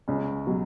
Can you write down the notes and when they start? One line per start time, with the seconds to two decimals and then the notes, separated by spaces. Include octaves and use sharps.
0.08 C#2 C#4
0.47 B2 F#3